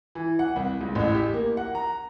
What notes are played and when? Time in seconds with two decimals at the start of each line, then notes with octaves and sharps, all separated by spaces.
0.15 E3
0.39 F#5
0.56 C2
0.81 C#2
0.95 A1
1.14 G4
1.34 A#3
1.57 F#5
1.75 A#5